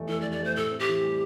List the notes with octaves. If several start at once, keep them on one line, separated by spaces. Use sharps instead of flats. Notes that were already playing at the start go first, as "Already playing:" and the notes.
Already playing: F1 E2 A3
E3 A4
D5
F1
D5
A3 C5
A2 A4
C4
G4
E3
G3